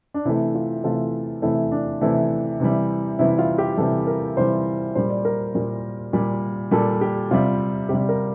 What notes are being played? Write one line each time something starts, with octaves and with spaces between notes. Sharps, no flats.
D4
C3 E3 A3 E4
F4
C3 E3 A3 F4
C3 E3 A3 E4
D4
C3 E3 A3 E4
C3 E3 G3
C3 E3 G3 E4
F4
G4
C3 E3 G3 A4
A#4
C3 E3 G3 C5
A#2 G3 C5
D5
A#4
A#2 G3
A#2 G3
A#2 G3 A4
G4
C3 G3 F4
C3 G3 G4
A#4